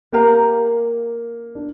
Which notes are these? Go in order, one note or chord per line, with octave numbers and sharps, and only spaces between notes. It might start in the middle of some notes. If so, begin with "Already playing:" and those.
A#3 G4 A#4 F5 A#5
D4